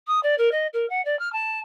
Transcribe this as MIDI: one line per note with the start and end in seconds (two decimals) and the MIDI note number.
0.07 0.19 87
0.23 0.35 74
0.38 0.49 70
0.51 0.67 75
0.73 0.87 70
0.89 1.03 78
1.05 1.17 74
1.19 1.30 89
1.32 1.59 81